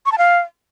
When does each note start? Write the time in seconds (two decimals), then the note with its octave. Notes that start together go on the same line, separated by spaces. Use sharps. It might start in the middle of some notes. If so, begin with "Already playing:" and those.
0.06 C#6
0.12 A5
0.18 F5